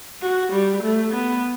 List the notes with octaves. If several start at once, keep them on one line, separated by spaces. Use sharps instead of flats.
F#4
G3
A3
B3